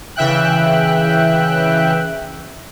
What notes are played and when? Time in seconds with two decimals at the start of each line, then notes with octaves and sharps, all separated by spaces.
0.16 C#3 E3 E5 G5 F#6